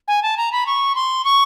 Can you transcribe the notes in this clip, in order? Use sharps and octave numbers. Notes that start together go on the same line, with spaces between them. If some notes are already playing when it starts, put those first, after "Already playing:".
G#5
A5
A#5
B5
C#6
C6
C#6